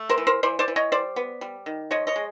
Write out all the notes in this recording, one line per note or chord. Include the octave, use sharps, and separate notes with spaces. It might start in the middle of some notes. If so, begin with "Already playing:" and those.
Already playing: A3
A#4 C5
E3
A#4 C5
E3 C5 D5
C5 D5
E3
C#5 D#5
G3 C5 D5
B3
G3
D#3
F3 C#5 D#5
C#5 D#5
G#3